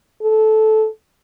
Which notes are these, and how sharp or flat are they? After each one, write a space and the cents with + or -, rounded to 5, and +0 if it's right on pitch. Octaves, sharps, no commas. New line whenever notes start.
A4 -15